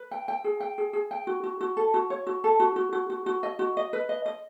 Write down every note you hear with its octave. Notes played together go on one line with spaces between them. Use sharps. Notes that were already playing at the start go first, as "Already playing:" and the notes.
Already playing: B4
G5
G5
G#4
G5
G#4
G#4
G5
F#4
F#4
F#4
A4
F#4
C#5
F#4
A4
F#4
F#4
F#4
F#4
F#4
D#5
F#4
D#5
B4
D#5
D#5